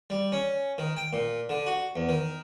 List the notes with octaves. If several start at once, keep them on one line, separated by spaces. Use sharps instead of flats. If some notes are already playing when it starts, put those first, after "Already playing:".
G3
C#4
D#3
G5
A#2
D3
F#4
E2
D#3